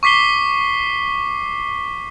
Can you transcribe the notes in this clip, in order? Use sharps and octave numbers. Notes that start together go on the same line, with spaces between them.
C#6 D6 B6 C7 G7